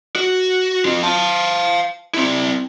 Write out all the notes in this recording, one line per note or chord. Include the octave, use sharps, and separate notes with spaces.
F#4
C4 F4
F5 A5
C4 E4